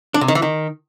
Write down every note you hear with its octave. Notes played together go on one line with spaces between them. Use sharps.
D4
C3
D#3
E3
D#3